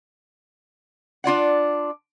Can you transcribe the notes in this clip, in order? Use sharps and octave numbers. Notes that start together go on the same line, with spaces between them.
D4 F4 D5 F#5